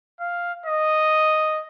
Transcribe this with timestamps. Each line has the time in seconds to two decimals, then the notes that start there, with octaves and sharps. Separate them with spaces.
0.20 F5
0.66 D#5